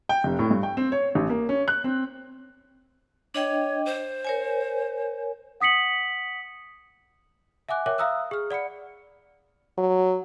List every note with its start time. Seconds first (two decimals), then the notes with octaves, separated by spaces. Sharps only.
0.09 G5
0.24 F1
0.39 A2
0.51 G2
0.63 G5
0.77 C4
0.92 C#5
1.15 A1
1.30 A#3
1.49 C#4
1.68 F#6
1.84 C4
3.34 D4 C#5 D#5 G5
3.86 C5
4.25 A#4 C#5 G#5
5.61 F#5 D#6 B6 C#7 F#7
7.69 E5 F#5 G#5 D6 F#6
7.86 A#4 C#5 E5 G5 D6 F#6
7.98 E5 F5 A#5 D#6 E6 F#6
8.31 G#4 F6
8.51 D5 F#5 B5 C#7
9.78 F#3